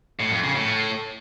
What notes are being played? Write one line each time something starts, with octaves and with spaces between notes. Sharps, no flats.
A2
F2
C#3
A2